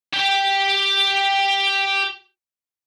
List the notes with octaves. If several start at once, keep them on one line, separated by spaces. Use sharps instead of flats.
G4 G5